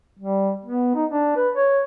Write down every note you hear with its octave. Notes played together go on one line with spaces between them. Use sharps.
G3
B3
D#4
D4
B4
C#5